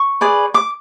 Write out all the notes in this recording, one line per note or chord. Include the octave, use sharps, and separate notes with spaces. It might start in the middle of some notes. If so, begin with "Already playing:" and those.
Already playing: C#6
G#4 B4 D5
D6